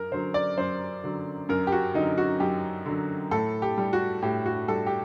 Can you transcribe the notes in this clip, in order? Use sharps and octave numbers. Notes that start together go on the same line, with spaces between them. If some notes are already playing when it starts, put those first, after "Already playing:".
Already playing: F#2 A#4
D3 F#3 C5
D5
F#2 C5
D3 F#3
F#2 A#4
G4
F#4
D3 F#3 D#4
F#4
F#2 G4
D3 F#3
A2 A4
G4
G3
F#4
A2 G4
F#4
G3 A4
G4